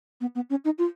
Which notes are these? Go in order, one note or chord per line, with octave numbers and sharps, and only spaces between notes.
B3
B3
C#4
D#4
F4